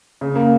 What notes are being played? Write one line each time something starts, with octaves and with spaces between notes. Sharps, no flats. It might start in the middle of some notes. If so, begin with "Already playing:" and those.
C#3
A#3